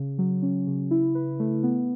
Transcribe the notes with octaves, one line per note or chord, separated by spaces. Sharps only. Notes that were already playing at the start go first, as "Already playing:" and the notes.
Already playing: C#3
F#3
C#4
C#3
E4
B4
A3
B3